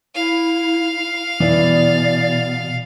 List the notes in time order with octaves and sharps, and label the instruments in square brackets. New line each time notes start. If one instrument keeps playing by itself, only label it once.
[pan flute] E4 [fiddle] F5
[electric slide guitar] B2 [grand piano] E3 [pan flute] D5